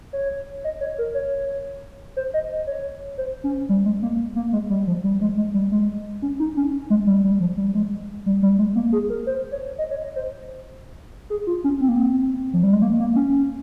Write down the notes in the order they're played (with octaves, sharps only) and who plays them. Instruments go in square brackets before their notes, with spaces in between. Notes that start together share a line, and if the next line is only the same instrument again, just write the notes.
[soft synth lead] C#5
D#5
C#5
A#4
C#5
C5
D#5
C#5
C5
C#4
G3
G#3
A#3
A#3
G#3
G3
F3
G3
G#3
G#3
G3
G#3
C#4
D#4
C#4
G#3
G3
G3
F3
G3
G#3
G3
G3
G#3
A#3
G#4
A#4
C5
C#5
D#5
C#5
D#5
C5
G#4
F4
C#4
C4
A#3
C4
F3
G3
G#3
A#3
A#3
C#4